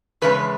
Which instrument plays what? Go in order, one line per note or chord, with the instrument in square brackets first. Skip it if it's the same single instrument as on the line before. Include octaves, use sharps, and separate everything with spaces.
[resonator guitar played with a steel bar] E2 C#3 G#3 B4